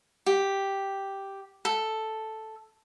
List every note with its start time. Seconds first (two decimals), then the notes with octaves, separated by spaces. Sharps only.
0.26 G4
1.65 A4